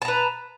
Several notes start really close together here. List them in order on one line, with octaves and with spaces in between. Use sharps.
A5 A#5 B4